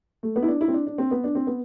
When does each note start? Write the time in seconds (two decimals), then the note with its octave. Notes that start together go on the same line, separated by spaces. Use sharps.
0.23 A3
0.36 B3
0.42 E4
0.48 D4
0.61 E4
0.68 C4
0.74 D4
0.87 D4
0.98 C4
1.11 B3
1.24 D4
1.35 C4
1.47 B3